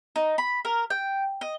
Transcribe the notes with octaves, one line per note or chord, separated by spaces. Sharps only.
D#4
B5
A#4
G5
D#5